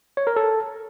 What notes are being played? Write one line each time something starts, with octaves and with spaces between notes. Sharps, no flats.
C#5
A#4
A4